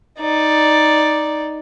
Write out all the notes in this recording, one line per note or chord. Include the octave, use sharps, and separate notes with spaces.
D#4 D5